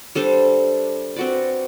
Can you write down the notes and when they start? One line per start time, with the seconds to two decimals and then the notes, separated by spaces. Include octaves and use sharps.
0.15 G3 D4 A4 C5
1.16 C4 F#4 B4 D5